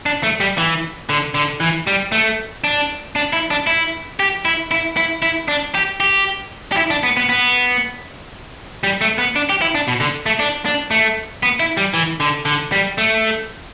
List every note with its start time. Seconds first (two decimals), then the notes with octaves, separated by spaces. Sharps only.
0.06 D4
0.23 A3
0.40 G3
0.58 E3
1.09 D3
1.35 D3
1.60 E3
1.87 G3
2.12 A3
2.64 D4
3.16 D4
3.33 E4
3.51 D4
3.67 E4
4.20 G4
4.45 E4
4.71 E4
4.97 E4
5.22 E4
5.48 D4
5.75 G4
6.00 G4
6.72 G4
6.77 E4
6.90 D4
7.03 B3
7.17 B3
7.29 B3
8.84 G3
9.01 A3
9.18 B3
9.36 D4
9.49 G4
9.61 E4
9.75 D4
9.88 B2
10.00 D3
10.26 A3
10.39 D4
10.66 D4
10.91 A3
11.43 B3
11.60 E4
11.77 G3
11.94 E3
12.20 D3
12.46 D3
12.72 G3
12.98 A3